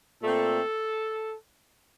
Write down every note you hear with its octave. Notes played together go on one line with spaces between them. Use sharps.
A#2 A3 C4 A4